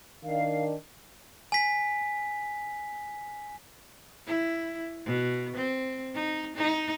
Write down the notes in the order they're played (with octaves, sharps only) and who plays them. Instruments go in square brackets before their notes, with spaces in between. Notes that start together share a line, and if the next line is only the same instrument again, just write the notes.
[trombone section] D#3 D4 [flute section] F5
[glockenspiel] G#5 B6
[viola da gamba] E4
B2
C4
D#4
D#4